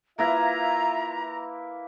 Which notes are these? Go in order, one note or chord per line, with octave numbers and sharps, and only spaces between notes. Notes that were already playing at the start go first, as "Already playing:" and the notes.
A#3 E4 F4 B4 E5 A#5